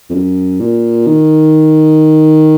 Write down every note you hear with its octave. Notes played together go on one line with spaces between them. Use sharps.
F2
F#2
A#2
D#3